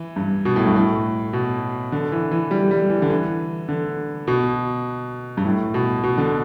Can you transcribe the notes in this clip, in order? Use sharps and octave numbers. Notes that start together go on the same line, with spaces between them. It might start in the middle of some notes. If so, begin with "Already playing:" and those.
Already playing: E3
G2
B2
A2
G2
A2
B2
D3
E3
E3
G3
G3
E3
D3
E3
D3
B2
G2
A2
B2
B2
D3